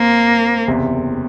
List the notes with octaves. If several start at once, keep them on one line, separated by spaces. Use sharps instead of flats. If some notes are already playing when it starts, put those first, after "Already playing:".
Already playing: F2 A#3 C4
F#1 E2 C3